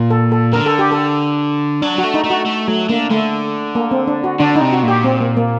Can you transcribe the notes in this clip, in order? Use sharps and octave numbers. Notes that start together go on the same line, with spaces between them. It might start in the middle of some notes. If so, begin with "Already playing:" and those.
Already playing: A#2
A4
A4
D3 A#4
A4
G4
A4
F#3 D4
F#4
A3
D#4
A3
F#4
A3
F#3 A3
D3 A#3
D3 A3
A#3
C4
D4
F#4
D3 D4
D#4
C3
F#4
A#2
G4
C4
A#3
A#3